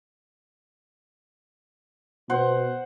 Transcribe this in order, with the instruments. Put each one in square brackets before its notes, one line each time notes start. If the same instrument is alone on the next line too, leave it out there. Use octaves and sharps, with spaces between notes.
[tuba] B2 [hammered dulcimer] C5 F#5